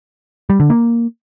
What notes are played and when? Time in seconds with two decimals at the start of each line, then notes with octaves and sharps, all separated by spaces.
0.50 G3
0.60 D3
0.70 A#3